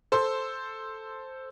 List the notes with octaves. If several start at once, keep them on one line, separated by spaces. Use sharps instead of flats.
A4 C5 C6 E6